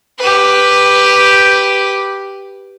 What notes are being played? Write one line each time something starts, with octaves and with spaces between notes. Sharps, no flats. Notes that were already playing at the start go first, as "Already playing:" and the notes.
G4 B4